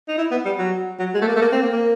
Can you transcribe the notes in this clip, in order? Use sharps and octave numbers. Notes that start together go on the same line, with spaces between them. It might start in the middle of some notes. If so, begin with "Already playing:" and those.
D#4
E4
B3
G3
F#3
F#3
G#3
A3
A#3
A3
A#3
C4
A#3
A#3